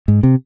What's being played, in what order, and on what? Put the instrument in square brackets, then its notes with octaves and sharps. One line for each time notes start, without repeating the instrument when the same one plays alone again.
[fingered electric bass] G#2
C3